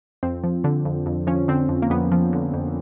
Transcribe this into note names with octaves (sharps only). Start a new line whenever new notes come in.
F2 C4
F3
D3
F2
F2
F3 C#4
D3 C4
F2
A#3
F2 B3
F3
D3
F2